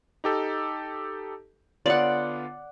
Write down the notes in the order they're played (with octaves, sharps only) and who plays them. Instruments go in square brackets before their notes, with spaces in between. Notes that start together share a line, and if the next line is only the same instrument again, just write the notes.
[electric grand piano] D#4 G4 A4
[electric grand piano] D3 B3 F4 [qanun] D5 F#5